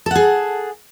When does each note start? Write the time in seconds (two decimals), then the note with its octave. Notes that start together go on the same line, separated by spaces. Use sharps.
0.06 A4
0.11 F#5
0.15 G#4